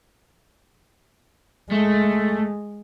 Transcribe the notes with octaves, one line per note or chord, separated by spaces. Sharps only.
G#3 A3